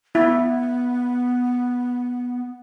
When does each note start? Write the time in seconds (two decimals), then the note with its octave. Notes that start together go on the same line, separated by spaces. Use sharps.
0.15 B3 E4